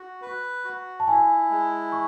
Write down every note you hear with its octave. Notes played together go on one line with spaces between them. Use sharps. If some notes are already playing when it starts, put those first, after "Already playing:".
Already playing: F#4
B4
F#4
A5
E4 G#5
G#3
C#6